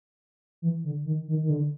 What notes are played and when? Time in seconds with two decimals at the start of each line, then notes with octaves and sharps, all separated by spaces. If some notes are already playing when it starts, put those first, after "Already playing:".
0.62 E3
0.84 D3
1.06 D#3
1.28 D#3
1.43 D#3
1.50 D3